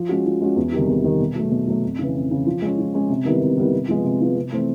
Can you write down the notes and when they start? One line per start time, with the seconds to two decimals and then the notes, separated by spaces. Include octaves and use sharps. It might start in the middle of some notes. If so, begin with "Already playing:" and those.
Already playing: F3
0.09 G#3 C#4 F#4
0.26 F3
0.41 G#3 C#4 F#4
0.56 E2
0.73 C3 D#3 G3
0.88 E2
1.04 C3 D#3 G3
1.20 B2
1.35 F#3 A3
1.51 B2
1.67 F#3 A3
1.84 F2
1.99 C#3 E3
2.15 F2
2.31 C#3 E3
2.46 F3
2.62 G#3 C#4
2.78 F3
2.94 G#3 C#4
3.10 C3
3.25 D#3 G3 B3 E4
3.41 C3
3.58 D#3 G3 B3 E4
3.73 C3
3.88 F3 G#3 B3
4.04 C3
4.21 F3 G#3 B3
4.37 C3
4.52 E3 A3 C4